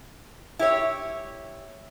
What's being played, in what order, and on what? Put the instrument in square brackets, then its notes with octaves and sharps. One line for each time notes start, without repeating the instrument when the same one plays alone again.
[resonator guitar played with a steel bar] E4 G4 C#5